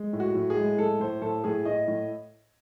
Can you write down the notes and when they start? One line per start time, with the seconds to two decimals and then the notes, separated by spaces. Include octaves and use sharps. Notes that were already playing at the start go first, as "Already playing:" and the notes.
Already playing: G#3
0.13 A2
0.20 F#4
0.35 A2
0.50 G#4
0.57 G#3
0.78 A2 A4
1.00 A2 C5
1.22 A2 A4
1.44 A2 G#4
1.65 A2 D#5
1.88 A2